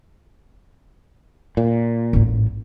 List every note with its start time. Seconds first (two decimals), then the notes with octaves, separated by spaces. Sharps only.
1.57 A#2
2.13 A1 G#2